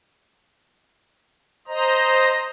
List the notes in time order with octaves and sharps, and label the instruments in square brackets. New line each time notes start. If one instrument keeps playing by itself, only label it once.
[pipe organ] C5 D#5 A#5